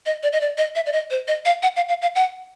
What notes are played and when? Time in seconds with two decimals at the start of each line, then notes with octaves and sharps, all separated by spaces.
0.06 D#5
0.23 D5
0.33 D#5
0.41 D5
0.58 D#5
0.75 E5
0.86 D5
0.93 D#5
1.10 C5
1.28 D#5
1.45 F5
1.63 F#5
1.76 F5
1.89 F5
2.02 F5
2.15 F#5